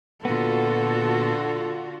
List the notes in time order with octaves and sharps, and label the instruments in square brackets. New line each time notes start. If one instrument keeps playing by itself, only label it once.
[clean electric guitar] A#2 B3 [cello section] D3 F4 F#4 [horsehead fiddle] A4